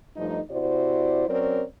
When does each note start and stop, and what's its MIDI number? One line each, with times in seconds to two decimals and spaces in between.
0.16 0.40 43
0.16 0.40 53
0.16 0.40 57
0.16 0.40 63
0.50 1.26 48
0.50 1.26 64
0.50 1.26 66
0.50 1.26 72
0.50 1.26 74
1.28 1.63 54
1.28 1.63 60
1.28 1.63 61
1.28 1.63 70
1.28 1.63 73
1.28 1.63 74